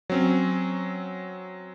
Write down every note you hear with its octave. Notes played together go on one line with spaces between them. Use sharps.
F#3 C4 C#4